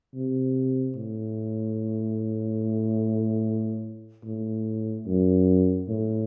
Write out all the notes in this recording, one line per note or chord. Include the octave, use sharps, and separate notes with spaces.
C3
A2
A2
F#2
A2